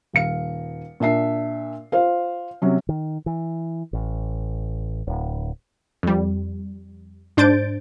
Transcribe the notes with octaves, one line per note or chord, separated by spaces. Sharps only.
D#1 F5 C#7
A#2 D4 E5 C7
F4 C5 F5
C3 F#3 C#4
D#3
E3
A1
D1
F2 G3
G#2 D4 C5 G6 A6 D7